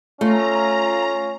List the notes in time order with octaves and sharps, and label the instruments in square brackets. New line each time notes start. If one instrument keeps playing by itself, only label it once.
[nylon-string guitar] A3 [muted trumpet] C#4 [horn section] F4 [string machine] A#5